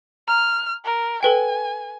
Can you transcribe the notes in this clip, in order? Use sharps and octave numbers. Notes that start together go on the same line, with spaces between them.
A#5 F6
A#4
A4 B4 G5 G#5